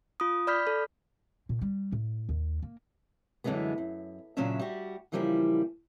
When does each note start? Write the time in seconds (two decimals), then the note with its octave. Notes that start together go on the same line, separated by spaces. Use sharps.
0.20 F4 D#6
0.47 D5 B5 F6 G6 B6
0.67 A4
1.49 A#2
1.62 G3
1.92 A2
2.29 D#2
2.62 A#3
3.44 F#2 D3 E3 F#3 G#3 B3
3.78 F#2
4.37 A#2 C#3 F#3 C#4 D4 E5
4.59 G3 F#4
5.12 C#3 E3 F3 G3 G#3 A#3